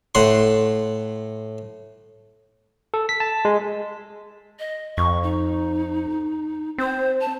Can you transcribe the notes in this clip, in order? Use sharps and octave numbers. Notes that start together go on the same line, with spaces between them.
A2 F#5 C6
A4
B6
A5
G#3
D#5
F2 C#6
D#4
C4 C5
A5